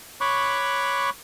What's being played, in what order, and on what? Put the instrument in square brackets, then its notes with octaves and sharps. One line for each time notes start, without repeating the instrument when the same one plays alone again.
[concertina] C#5 B5 C#6 D6 F#6